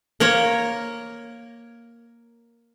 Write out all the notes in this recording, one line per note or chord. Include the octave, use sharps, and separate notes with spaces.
A#3 A#4 C#5